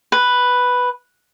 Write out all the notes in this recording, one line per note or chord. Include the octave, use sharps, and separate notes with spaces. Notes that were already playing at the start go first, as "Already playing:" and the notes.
B4